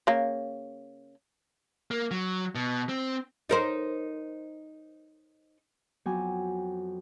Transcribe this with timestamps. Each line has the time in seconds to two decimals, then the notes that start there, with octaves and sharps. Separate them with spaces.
0.07 C#3 A#3
1.91 A#3
2.11 F#3
2.55 B2
2.89 C4
3.49 D#4 A#4 C5
6.06 F2 F#3 B3 G5 G#5 D6